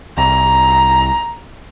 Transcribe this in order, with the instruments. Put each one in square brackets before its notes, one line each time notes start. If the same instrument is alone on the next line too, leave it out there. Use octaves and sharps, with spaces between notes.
[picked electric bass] C2 [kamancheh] A#5